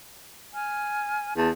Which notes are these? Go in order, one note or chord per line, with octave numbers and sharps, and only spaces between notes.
G#5 F6
E2 A5